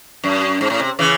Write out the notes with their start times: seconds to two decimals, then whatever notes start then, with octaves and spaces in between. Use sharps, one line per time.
0.24 F#2
0.61 G#2
0.70 A2
0.80 C3
0.99 C#3 E3